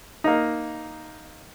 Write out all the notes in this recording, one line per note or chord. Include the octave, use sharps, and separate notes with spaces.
A#3 D#4